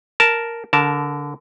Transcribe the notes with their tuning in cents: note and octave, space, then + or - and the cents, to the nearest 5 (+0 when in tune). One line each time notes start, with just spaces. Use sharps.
A#4 +0 A5 +0
D3 -20 A#4 +0 A5 +0